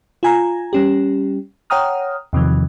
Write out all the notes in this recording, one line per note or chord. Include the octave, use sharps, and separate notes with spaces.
F4 G#5 A#5
G3 C#4 G4
C#5 F#5 G5 A#5 D#6 F6
E2 C3 D#3 F3